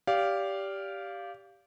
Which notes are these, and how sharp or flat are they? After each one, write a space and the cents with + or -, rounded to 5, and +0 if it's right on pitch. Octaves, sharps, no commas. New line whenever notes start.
G4 +0 D5 -30 F5 -5